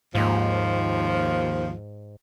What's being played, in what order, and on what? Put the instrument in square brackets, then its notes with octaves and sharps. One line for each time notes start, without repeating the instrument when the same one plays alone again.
[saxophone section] D#2 F3 [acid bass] G#2